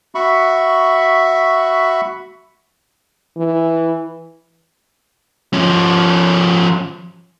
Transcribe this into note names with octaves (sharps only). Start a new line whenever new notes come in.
F#4 E5 B5 C#6
E3
F3 C#4